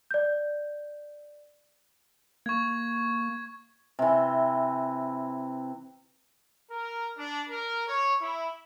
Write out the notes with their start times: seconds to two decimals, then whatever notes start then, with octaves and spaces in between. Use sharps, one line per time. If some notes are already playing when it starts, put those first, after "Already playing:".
0.11 D5 G6
2.46 A#3 C#6 G#6
3.99 C3 E3
6.71 A#4
7.18 D4
7.48 A#4
7.87 C#5
8.20 E4